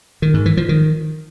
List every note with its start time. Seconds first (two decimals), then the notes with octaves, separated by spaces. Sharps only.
0.22 D#3
0.34 G#2
0.46 E3
0.57 F3
0.69 D#3